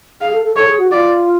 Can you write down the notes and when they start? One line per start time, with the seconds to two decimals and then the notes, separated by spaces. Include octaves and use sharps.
0.21 G#4 F5
0.33 A4
0.44 A4
0.56 A4 C#5
0.68 G#4
0.79 F#4
0.91 F4 D5